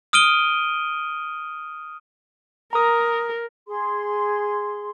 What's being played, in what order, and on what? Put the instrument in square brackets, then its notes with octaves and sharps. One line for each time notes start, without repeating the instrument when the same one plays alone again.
[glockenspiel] D#6 F6 D7 D#7 G7
[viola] A#4 [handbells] A#5 D#6
[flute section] G#4 C6